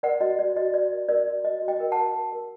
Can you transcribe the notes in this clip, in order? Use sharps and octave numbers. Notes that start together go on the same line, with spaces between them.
A#4 D5 F#5
F#4 D#5
F#4 D5
F#4 D#5
F#4 D5
A#4
A#4 D5
F#4
F#4 D#5
F#4
D#5 G5
A#4
F#5 A5
A#4
A#4
A#4